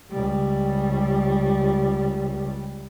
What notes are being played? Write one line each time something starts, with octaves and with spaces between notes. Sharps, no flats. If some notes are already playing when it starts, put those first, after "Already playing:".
C#2 G3